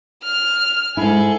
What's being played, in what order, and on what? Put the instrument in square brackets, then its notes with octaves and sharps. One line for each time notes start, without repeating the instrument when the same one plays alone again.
[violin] F6
[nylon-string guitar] G#2 E4 [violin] G#4 A4